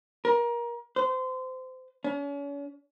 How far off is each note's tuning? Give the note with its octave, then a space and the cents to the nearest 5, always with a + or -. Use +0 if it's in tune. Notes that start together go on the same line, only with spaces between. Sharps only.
A#4 +25
C5 -25
C#4 +40